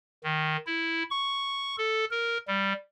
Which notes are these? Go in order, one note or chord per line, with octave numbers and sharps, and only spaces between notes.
D#3
E4
C#6
A4
A#4
G3